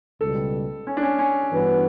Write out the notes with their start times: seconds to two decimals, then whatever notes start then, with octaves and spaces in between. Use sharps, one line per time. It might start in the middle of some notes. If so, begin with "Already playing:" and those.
0.21 C#2 B2 G3 A4
0.87 C#4
0.97 D4
1.03 C#4
1.19 C#4
1.52 G2 E3 B3 F#4 B4